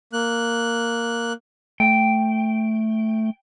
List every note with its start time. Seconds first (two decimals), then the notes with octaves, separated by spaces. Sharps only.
0.13 A#3 F#6
1.80 A3 G5